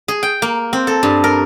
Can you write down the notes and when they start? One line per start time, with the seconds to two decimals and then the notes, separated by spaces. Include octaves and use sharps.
0.08 G#4
0.23 G5
0.42 A#3
0.73 C4
0.87 A4
1.03 G2
1.24 A#4